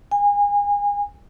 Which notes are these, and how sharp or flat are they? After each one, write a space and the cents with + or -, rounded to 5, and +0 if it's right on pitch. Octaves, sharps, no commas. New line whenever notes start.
G#5 -30